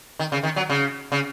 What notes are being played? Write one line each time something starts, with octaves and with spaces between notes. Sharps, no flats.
D#3
C#3
D#3
F#3
C#3
C#3